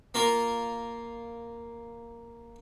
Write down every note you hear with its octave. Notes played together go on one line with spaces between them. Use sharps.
A#3 F4 A#4